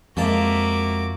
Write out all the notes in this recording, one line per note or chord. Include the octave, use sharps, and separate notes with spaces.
F2 F3 G#3 A#3 F#4 E5 A5 D6